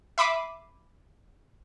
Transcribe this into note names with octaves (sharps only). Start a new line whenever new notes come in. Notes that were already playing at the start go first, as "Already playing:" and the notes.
E5 B5 D6 C7 D#7